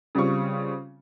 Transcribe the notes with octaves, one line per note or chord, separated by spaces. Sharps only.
C#3 G3 C4 F4 C#6